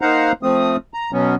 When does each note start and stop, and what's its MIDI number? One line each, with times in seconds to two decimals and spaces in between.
0.01 0.32 58
0.01 0.32 63
0.01 0.32 72
0.01 0.32 77
0.01 0.32 78
0.01 0.32 82
0.43 0.77 53
0.43 0.77 57
0.43 0.77 60
0.43 0.77 87
0.94 1.11 82
1.13 1.35 47
1.13 1.35 54
1.13 1.35 59
1.13 1.35 61